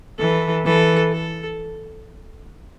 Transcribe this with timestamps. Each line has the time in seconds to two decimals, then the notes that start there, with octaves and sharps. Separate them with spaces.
0.19 E3 A4
0.65 E3 A4
1.12 A4